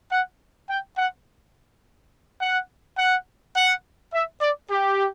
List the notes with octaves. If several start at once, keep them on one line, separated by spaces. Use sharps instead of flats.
F#5
G5
F#5
F#5
F#5
F#5
E5
D5
G4